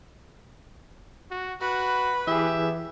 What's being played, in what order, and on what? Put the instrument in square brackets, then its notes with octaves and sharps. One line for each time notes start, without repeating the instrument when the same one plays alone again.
[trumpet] F#4
[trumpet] F#4 [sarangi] B4
[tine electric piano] E3 E4 G#4 [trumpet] G4 [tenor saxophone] E5